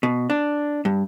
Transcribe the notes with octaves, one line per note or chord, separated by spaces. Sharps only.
B2
D4
G2